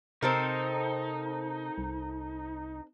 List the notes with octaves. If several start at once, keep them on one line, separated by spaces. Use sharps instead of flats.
C3 C4 D#4 A4 A#4
C2